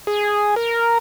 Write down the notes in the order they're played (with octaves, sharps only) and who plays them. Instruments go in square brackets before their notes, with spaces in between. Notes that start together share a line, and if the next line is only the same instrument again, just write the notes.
[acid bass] G#4
A#4